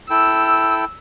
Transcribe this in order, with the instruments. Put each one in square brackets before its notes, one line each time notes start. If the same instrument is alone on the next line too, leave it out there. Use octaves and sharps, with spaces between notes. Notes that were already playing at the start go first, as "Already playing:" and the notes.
[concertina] E4 A4 G5 [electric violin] E6